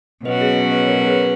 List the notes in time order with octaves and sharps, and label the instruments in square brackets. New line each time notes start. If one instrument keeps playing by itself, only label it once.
[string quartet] B2 F#3 C#4 F#4 [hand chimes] B4 D#5
[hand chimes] G#4
G#4
B4 D#5
A#4 C#5
G#4 B4